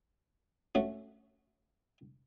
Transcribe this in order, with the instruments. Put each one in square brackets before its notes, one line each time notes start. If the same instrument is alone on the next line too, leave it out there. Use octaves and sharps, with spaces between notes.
[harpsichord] A3 C#4 F#4